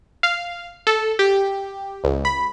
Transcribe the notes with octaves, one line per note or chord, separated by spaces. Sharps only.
F5
A4
G4
C#2
B5